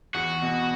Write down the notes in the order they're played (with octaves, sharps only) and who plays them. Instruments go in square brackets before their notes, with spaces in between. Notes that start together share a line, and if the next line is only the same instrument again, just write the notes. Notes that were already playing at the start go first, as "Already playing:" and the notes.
[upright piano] E2 [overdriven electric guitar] F#4
[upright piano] B2